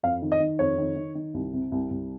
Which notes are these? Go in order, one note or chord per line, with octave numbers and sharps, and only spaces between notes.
F2 F5
D#3
D#5
D#3
F2 C#5
D#3
D#3
D#3
C2
C3
C2
C2